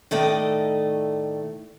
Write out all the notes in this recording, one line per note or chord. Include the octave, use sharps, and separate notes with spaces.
A2 D#3 A3 D5 D#5